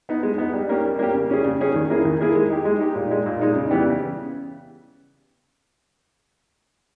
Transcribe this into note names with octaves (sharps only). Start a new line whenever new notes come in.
B3 D#4
G#3
B3 D#4
G3
A#3 C#4 G4
G3
A#3 C#4 G4
C#3
G3 C#4 G#4
C#3
G3 C#4 G#4
D#3
A#3 E4 G#4
D#3
A#3 E4 G#4
G#3
D#4 G4
G#3
D#4 G4
A#2
G#3 D#4
A#2
G#3 D#4
C#3
E3 G3 B3 G4
C#3